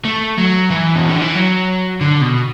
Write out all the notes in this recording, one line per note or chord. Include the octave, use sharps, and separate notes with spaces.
A3
F#3
E3
B2
D3
E3
F#3
D3
B2